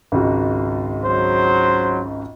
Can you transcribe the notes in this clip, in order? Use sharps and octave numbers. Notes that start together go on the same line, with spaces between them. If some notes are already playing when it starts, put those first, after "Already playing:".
G#1 C#2 F#4
F#3 C5